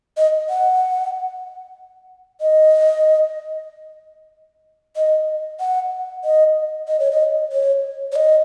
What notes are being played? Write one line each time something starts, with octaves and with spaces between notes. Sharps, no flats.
D#5
F#5
D#5
D#5
F#5
D#5
D#5
C#5
D#5
C#5
C#5
D#5